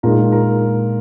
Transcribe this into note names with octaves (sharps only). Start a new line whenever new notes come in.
A#2 G#3 D#4 A#4
A#4